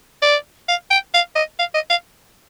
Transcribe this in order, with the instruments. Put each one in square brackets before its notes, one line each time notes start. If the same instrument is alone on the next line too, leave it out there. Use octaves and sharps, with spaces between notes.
[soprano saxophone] D5
F5
G5
F5
D#5
F5
D#5
F5